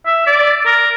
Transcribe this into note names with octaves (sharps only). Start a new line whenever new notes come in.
E5
D5
A#4